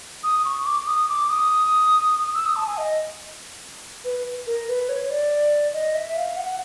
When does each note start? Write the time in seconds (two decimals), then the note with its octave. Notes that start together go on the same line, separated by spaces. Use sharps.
0.24 D#6
0.45 C#6
0.66 D6
0.87 D#6
1.09 D6
1.30 D#6
2.35 E6
2.46 D#6
2.56 A5
2.67 G#5
2.78 D#5
4.04 B4
4.47 A#4
4.68 B4
4.89 C#5
5.10 D5
5.73 D#5
5.95 E5
6.16 F5
6.37 F#5